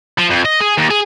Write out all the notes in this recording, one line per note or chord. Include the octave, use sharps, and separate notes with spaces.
F3
F2
D#5
G#4
D#2
G#4